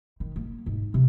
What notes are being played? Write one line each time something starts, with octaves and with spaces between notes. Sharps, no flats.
D#3
A#3
G#2
C3